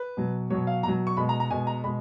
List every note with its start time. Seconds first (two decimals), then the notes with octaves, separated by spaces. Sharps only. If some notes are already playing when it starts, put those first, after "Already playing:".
Already playing: B4
0.17 B2 F#3
0.50 B2 F#3 C#5
0.67 F5
0.83 B2 F#3 A#5
1.07 C#6
1.17 B2 G#3 B5
1.29 A#5
1.40 A#5
1.51 B2 G#3 G#5
1.67 A#5
1.84 B2 G#3 B5